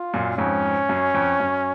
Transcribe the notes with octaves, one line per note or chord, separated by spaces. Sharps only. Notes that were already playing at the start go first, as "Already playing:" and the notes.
Already playing: F4
F#2 A#2
F2 G#2 C#4
F#2
F2
F#2